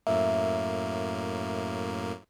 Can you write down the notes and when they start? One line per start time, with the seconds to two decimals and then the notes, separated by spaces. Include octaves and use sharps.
0.07 F#2 A2 A#3 E5